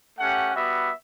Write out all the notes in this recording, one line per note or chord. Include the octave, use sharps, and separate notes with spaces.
A3 C#4 G4 F#5
G3 B3 F#4 E5